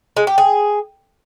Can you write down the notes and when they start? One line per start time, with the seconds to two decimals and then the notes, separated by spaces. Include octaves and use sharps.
0.17 G#3
0.27 G4
0.38 G#4